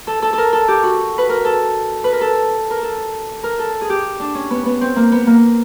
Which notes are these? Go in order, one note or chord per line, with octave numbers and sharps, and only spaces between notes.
A4
A4
A4 A#4
A4
G4
F#4
B4
A#4
A4
B4
A#4
A4
A#4
A4
A#4
A4
G#4
G4
D4
C#4
B3
B3
C4
A#3
B3
A#3